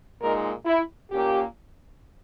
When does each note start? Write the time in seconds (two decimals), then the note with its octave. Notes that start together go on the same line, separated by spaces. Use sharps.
0.20 A#2 G#3 D#4 A#4
0.66 E4
1.11 A#2 A#3 C#4 G4